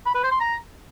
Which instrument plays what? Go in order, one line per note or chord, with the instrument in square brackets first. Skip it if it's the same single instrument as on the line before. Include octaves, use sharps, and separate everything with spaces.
[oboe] B5
B4
C5
C6
A#5